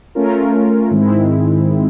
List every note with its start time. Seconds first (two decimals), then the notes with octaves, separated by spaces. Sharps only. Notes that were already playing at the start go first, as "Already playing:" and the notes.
0.15 A3 C#4 F4 A#4
0.91 G#2 D#3 G#3 C4 E4